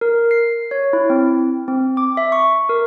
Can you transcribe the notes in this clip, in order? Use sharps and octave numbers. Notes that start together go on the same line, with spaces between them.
A#4
C7
C#5
E4
C4
C4
D6
E5
C#6
A#4